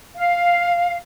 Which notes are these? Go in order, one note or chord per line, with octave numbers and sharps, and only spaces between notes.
F5